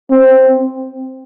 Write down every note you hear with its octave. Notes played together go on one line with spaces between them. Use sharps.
C4